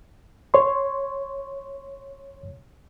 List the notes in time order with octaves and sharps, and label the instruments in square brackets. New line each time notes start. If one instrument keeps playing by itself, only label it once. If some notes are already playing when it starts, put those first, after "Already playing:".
[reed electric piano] C#5 C6